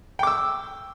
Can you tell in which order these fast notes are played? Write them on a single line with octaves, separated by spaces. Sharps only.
G5 D6 E6